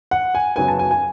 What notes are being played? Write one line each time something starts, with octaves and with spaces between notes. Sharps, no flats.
F#5
G#5
F#2 C#3 F#3 B3 G#5
A5
G#5
G#5